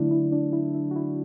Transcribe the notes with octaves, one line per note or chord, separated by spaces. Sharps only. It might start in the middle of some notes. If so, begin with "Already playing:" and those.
Already playing: D3 F#3 A3 D4 E4
E4
D4
E4
E4
F#4
E4